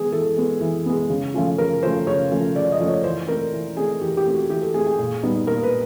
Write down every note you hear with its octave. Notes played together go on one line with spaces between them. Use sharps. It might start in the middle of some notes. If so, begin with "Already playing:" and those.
Already playing: E3 G#3 B3 G#4
E3 A4
G#3 B3
E3
G#3 B3
C#3
F3 A3 C#4 F4
C#3 A#4
F3 A3 C#4 F4 C5
C#3 C#5
F3 A3 C#4 F4
C#3 D5
D#5
F3 A3 C#4 F4
C#5
E3 C5
A3 C4 A#4
E3
A3 C4 G#4
E3 G4
G4
A3 C4
F#4
E3 G4
A4
A3 C4 G#4
G#4
A#2
G3 B3 D#4
A#2 A#4
B4